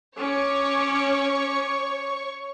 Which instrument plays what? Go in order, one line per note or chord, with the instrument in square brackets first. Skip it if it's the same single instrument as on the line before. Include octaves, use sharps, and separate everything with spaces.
[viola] C#4 D6 [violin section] C#5 C#6